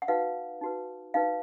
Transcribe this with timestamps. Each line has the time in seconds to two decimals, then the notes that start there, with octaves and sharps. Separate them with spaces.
0.02 F#5
0.08 D#4 F#4 B4 F5
0.61 D#4 F#4 B4
1.14 D#4 F#4 B4 F5